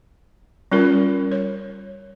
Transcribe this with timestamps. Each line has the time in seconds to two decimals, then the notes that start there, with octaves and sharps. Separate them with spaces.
0.72 G3 C#4 F4 A#4
1.32 C#5